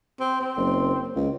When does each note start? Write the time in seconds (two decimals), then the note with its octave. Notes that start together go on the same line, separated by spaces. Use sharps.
0.20 C4
0.41 C4
0.57 F#1
1.16 C#2